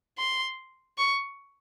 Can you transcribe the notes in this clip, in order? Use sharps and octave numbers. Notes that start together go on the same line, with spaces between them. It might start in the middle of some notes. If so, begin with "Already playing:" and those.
C6
C#6